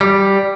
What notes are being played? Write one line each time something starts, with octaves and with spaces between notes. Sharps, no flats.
G3